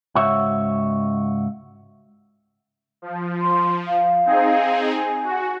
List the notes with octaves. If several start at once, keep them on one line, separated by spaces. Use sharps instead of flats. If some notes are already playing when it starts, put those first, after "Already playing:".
C#2 G#2 F#4 C#5 E5
F3
C6
F5
C4 D#4 G#4
G#5
F#4